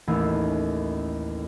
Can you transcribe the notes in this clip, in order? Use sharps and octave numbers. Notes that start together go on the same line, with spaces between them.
A1 D#2 A3 C#4 E4 E6